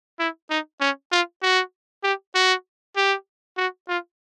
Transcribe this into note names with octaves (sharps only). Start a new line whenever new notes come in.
E4
D#4
C#4
F4
F#4
G4
F#4
G4
F#4
F4